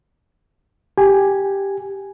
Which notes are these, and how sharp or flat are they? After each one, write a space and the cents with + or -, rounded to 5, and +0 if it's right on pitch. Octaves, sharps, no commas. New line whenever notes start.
G4 +0 G#5 +0